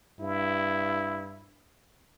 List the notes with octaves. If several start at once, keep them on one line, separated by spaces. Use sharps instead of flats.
G2 E4